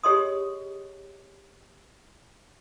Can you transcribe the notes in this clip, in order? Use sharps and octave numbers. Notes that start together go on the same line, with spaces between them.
G4 G#4 C#5 D#5 C6 D#6